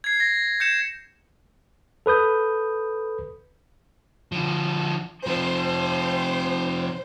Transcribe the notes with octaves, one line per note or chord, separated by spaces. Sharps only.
G#6 C7
A#6
G6 C#7 E7
A4 B4 D#6 G6
D3 F3
C3 F3 C5